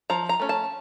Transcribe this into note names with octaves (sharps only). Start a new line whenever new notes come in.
F3 A#5
A#5
A3 C#4
A5